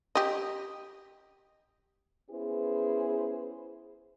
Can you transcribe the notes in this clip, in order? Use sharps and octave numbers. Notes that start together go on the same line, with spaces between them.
G4 D#5
B3 C#4 E4 G#4 B4 C5